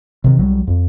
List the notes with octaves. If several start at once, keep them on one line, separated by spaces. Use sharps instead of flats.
C3 D#3
C2 F#3 G3
F2